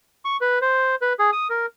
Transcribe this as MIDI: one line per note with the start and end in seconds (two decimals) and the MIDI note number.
0.25 0.37 85
0.41 0.59 71
0.62 0.95 72
1.02 1.13 71
1.19 1.31 68
1.33 1.48 87
1.50 1.66 70